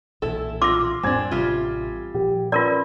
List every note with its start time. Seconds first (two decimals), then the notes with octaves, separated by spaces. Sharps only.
0.22 B1 A#2 E3 E4 A4
0.62 F4 C6 D6 E6 A#6
1.03 F2 A2 G3 C4 D4 G#5 G#6 A6
1.31 A1 C3 G3 F4
2.14 A#2 F3 G4
2.52 C#4 F4 A#4 B4 D5 C6 E6